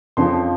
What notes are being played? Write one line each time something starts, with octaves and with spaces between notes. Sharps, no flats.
F2 C#3 F3 C6